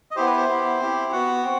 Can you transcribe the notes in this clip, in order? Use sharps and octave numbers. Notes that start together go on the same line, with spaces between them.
D#5
B3 E4 G4 C5
B4
C5
B3 E4 G4
C4 E4 G4
B3 F#4 F#5
C4